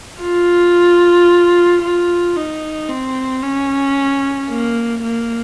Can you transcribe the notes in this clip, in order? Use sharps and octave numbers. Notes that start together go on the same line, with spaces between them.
F4
F4
D#4
C4
C#4
A#3
A#3